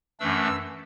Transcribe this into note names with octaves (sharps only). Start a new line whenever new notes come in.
F#2 E3 A3 D4 E6